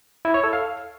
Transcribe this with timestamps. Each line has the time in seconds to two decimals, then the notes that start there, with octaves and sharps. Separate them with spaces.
0.25 E4
0.34 C#5
0.44 A4
0.53 F5